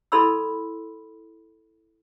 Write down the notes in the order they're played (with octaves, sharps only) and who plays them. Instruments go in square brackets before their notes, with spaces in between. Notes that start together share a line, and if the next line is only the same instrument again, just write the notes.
[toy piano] E4 A4 D5 B5 C6 E6